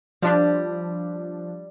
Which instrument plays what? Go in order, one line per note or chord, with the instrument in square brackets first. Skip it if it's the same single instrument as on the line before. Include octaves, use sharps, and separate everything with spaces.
[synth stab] F3 D4 [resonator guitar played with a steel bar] G3